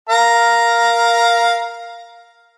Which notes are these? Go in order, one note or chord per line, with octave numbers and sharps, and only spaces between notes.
A#4 F5 A#5